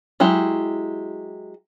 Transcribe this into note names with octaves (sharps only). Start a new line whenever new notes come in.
F#3 G#3 E4 G4